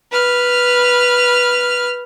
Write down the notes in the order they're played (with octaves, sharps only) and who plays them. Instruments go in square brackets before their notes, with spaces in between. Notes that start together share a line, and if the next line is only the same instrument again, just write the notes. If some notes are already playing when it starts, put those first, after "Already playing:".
[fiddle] B4 F6